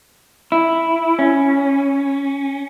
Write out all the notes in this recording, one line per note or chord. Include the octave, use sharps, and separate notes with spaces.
E4
C#4